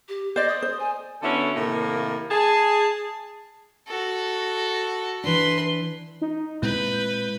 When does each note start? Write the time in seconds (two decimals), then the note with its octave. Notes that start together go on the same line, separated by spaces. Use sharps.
0.09 G4
0.36 C5 D5 D#5
0.48 D#6
0.62 C5
0.79 G#5
1.23 D3 B3 C#4 E4 F#4 A4
1.55 A2 C3 D#3 A#3
2.31 G#4 A5
3.88 F#4 A4
5.24 E3 D4 B4 C6
6.21 D#4
6.62 A#2 G#3 C4 E4 B4 G6